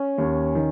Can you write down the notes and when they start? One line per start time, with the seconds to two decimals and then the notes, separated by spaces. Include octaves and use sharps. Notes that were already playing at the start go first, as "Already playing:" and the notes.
Already playing: C#4
0.18 D#2
0.55 D#3